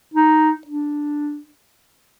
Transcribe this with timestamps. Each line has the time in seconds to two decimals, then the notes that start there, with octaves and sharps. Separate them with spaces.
0.14 D#4
0.67 D4